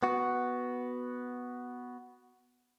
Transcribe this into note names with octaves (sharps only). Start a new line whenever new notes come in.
B3 F#4